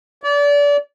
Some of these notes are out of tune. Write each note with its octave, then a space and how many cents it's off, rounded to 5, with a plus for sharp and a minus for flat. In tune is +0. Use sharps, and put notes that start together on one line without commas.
D5 -30